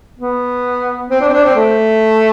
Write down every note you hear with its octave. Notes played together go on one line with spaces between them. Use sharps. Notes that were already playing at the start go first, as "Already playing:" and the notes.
B3
C4
D4
C4
D4
C4
A3